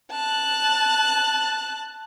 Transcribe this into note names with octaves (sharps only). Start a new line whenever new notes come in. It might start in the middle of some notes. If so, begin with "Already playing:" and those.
A5 F#6